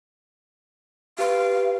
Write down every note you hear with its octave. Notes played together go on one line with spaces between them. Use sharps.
G4 B4 F5 D7